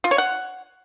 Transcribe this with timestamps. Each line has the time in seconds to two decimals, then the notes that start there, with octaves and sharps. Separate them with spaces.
0.04 F4
0.11 C#5
0.18 F#5